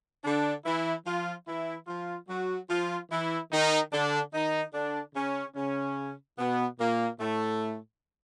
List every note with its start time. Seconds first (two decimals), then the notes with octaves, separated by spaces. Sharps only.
0.24 D3 D4
0.66 E3 E4
1.06 F3 F4
1.47 E3 E4
1.88 F3 F4
2.29 F#3 F#4
2.70 F3 F4
3.10 E3 E4
3.52 D#3 D#4
3.92 D3 D4
4.33 D#3 D#4
4.74 D3 D4
5.15 C#3 C#4
5.56 C#3 C#4
6.39 B2 B3
6.80 A#2 A#3
7.19 A2 A3